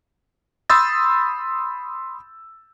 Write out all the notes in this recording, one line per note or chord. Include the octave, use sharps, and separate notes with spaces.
B5 C6 D#6 E6 G6 A6